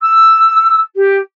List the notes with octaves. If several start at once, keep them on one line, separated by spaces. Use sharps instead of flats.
E6
G4